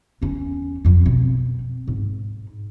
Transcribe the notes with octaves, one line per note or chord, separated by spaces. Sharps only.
E2 C#4
F2 F3
B2 C4
G#2